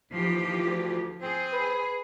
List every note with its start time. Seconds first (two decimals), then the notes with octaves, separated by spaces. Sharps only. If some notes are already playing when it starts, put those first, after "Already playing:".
0.11 D#2 E3 F3 G4
0.64 D2
1.22 C4 G#4
1.53 B4